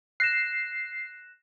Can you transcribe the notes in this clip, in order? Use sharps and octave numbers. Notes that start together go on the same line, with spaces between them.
F#6 A#6 C7 E7